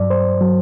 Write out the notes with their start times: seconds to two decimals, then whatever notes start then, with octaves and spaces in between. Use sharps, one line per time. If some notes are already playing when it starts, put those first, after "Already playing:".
Already playing: G2 F#3 D5
0.10 C5
0.41 F#3